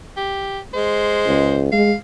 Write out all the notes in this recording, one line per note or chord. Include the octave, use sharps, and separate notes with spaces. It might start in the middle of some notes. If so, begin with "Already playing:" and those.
G4
G#3 C5
C#2
G#3 F5